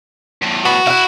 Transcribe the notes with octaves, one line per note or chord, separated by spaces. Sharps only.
E2 A2
B3 F#4
E4 F5 F#5